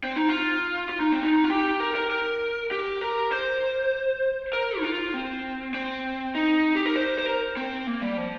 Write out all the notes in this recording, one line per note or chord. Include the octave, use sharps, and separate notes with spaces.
C4
D#4
F4
F4
D#4
C4
D#4
F4
G4
A#4
A#4
A#4
G4
A#4
C5
A#4
D#4
F4
C4
C4
D#4
G4
A#4
C5
C5
A#4
C4
A#3
G3
F3